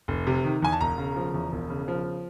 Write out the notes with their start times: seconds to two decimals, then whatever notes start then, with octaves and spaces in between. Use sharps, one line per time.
0.08 F1
0.27 C3
0.44 D#3
0.62 E2 G#5
0.72 A5
0.81 E1 A#5
0.98 C#3
1.16 F3
1.34 E2
1.52 E1
1.70 C#3
1.88 F3